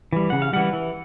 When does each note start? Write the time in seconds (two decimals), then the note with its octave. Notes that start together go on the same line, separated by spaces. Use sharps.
0.13 E3 G3
0.30 C#3 F#5
0.42 F5
0.53 E3 G3 F#5
0.73 E3